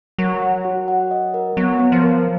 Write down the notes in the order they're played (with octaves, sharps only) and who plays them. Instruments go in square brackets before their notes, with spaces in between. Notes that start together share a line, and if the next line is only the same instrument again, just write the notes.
[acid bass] F#3 [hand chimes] A#4
[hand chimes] F#5
F#4
F#5
D#5
A#4
[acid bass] F#3 [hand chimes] B3
[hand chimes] B3
[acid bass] F3
[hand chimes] A#4